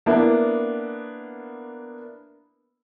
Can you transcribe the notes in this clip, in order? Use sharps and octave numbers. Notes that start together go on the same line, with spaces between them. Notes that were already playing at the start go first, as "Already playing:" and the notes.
A#3 B3 D4 E4